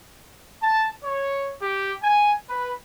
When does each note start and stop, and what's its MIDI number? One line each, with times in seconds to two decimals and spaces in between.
0.62 0.87 81
1.03 1.50 73
1.62 1.92 67
2.02 2.32 80
2.49 2.71 71